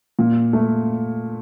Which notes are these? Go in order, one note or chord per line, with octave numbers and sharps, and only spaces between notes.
A#2
A3